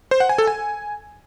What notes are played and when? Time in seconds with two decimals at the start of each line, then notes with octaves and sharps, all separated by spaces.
0.11 C5
0.20 F#5
0.29 G#5
0.38 A4
0.47 G#5